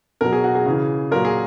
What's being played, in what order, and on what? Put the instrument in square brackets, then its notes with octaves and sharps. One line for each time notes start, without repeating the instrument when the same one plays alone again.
[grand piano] B2 F#3 A#4
G#4
F#4
G#4
C#3 E3
A#2 F#3 A#4
G#4